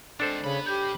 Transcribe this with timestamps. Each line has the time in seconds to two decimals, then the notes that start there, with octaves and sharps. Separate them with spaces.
0.20 G#3 C4 D4 A4 C5
0.44 C#3 B3 C#5 B5
0.66 G4 C#5 B5 G6